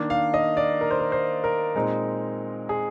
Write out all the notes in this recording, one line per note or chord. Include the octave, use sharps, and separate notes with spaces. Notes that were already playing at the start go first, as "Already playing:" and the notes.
Already playing: D#3 A#3 D4
F5
D#5
D5
A#4
C5
A#4
C5
A#4
A#2 G#3 C4 D#4
G#4